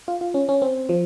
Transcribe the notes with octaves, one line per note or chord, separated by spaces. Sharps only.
F4
F4
C#4
C#4
C4
F3